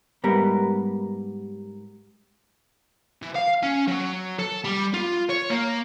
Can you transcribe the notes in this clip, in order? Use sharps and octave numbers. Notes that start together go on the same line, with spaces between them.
G#2 G3 B3 A#4
E3
F5
C#4
F#3
A4
G3
F4
C#5
A#3